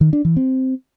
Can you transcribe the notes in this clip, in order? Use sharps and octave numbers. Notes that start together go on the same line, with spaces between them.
D#3
D4
E3
C4